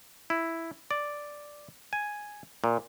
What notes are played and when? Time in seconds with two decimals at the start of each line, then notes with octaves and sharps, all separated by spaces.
0.30 E4
0.91 D5
1.93 G#5
2.64 A#2